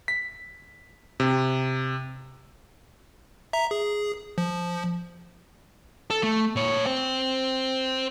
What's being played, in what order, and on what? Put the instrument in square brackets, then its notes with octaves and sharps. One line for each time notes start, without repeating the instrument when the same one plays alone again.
[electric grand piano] B6
C3
[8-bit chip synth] E5 A#5
G#4
F3
[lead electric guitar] A4
A3
A#2 C#5
C5 G5